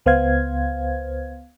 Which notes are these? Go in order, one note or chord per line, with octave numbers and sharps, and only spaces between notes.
C#2 B3 C5 F5 G#6